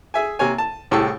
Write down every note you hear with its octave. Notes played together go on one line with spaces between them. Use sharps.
G#4 E5 G#5
C3 A#3 C#5 G#5
A5
C2 A2 G4 G#4 A5 E6